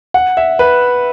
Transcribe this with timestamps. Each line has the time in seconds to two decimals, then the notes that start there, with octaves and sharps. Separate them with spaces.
0.14 F#5
0.37 E5
0.59 B4